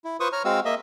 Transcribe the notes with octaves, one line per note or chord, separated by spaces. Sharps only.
E4
F4 B4 C5 C#6 D#6
C#5 A#5 F6
G#3 C4 F#4 F5 E6
A#3 D#5 E5